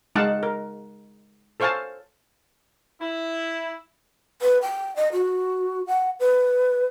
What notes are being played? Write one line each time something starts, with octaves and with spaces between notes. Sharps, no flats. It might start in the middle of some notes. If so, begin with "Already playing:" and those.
G#3 D#4 F5 F#5 A5
A#4
A4 C5 C#5 F5 G#5 A5
E4
B4
G5
D#5
F#4
F#5
B4